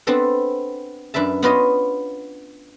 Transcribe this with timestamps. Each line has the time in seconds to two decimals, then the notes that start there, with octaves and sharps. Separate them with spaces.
0.07 B3 C4 D4 A4 B4
1.14 F#2 D4 B4 E5 A5
1.42 B3 D4 F4 B4 C#5 D#5